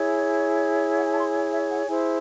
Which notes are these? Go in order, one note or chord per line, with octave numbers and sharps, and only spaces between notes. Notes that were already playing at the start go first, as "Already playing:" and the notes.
Already playing: E4 G#4 C#5
F#5
G#5
A5
C6
G#5
E5
F#5
E4 G#4 C5 G#5